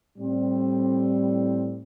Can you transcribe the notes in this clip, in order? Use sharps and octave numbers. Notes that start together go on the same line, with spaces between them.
A2 G3 C4